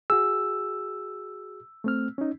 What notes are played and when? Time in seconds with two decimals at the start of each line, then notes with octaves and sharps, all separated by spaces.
0.10 F#4 G#4 E6
1.84 A3 C4 F6
2.18 C#4 D#4